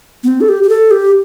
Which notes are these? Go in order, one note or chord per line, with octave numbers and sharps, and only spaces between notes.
B3
C4
A4
G4
G4
A4
G4